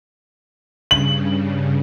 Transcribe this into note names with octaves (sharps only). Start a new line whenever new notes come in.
G2 C#3 F#7